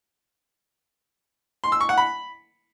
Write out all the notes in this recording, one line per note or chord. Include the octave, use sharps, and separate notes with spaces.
C6
E6
C#6
F#5
B5